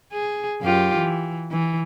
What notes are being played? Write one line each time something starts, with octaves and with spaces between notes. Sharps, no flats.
G#4
F#2 F4 G4
E3
E3